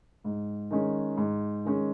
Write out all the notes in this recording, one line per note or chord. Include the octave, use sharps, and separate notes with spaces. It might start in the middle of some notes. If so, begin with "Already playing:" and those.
G#2
D#3 G#3 C#4
G#2
D#3 G#3 C#4